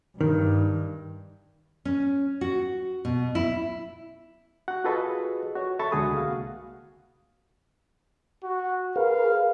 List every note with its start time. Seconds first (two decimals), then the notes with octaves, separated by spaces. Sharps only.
0.21 G2 D#3
1.85 C#4
2.41 F#4
3.05 B2
3.35 E4
4.68 F#4 F#5
4.84 F4 F#4 G#4 A4 B4 D#5
5.55 F#4 C#5
5.79 A4 E5 B5 C#6 A6
5.92 C#2 D3 G#3 F#4 G#4 D#6
6.17 C2 A#3 F#4 F5
8.43 F#4
8.96 G#4 A#4 B4 F5